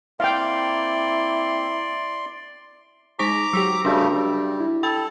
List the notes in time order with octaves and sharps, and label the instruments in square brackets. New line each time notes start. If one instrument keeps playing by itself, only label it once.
[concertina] A#3 C4 [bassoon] E4 [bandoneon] D5 C6 [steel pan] F5 G5
[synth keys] G#3 D#4 G#4 [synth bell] C5 C#6 B6 [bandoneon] A#5 D6
[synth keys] F#3 G4 [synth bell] E6 B6 F7
[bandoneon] C#3 G3 A3 [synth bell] D4 F#4 [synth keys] G5
[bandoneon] G3
[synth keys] E4
[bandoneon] A4 [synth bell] G5 B5 A6